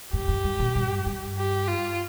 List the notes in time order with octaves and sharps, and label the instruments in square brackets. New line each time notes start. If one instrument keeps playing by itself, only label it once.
[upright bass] G#2 [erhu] G4
[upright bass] G2
G2
A#2
G2
G2
[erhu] G4
F4